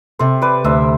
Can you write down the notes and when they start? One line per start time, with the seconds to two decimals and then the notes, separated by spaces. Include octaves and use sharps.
0.19 C3 A4 C5
0.42 B4 D5
0.64 D2 C5 E5